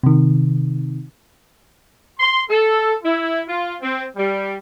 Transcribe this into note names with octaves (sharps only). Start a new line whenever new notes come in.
C3 D#3
C6
A4
E4
F4
C4
G3